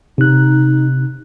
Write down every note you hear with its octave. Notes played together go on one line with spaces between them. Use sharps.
C3 D#4 F#6